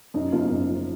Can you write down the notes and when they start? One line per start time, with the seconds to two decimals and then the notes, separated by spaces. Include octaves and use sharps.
0.14 F#2 D#4
0.32 F#1 F4
0.50 F#1
0.69 F3